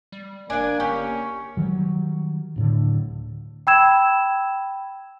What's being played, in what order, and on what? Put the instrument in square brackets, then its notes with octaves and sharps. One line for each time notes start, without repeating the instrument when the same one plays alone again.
[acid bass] G3
[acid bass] F#1 [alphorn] A#3 [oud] D4 D5 [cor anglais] G#5
[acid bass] G1 [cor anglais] C#4 [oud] G4
[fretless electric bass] D#3 F#3 G3
D1 A2 D3
[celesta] G5 B5 E6 G#6 E7